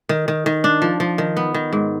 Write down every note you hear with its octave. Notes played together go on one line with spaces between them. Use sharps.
D#3
D#3
D#3
D4
F3
F3
D#3
B3
D#3
G#2